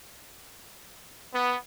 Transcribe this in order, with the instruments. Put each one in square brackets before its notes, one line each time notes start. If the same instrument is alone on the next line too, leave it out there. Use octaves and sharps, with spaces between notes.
[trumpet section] B3